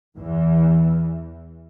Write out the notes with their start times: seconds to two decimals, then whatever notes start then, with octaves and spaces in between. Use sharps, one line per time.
0.18 E2 E3